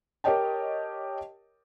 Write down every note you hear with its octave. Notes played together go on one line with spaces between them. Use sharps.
G4 A#4 C#5 D#5 G5 A5